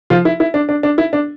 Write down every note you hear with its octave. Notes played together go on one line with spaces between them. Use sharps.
F3 F4
E4
E4
D4
D4
D4
E4
D4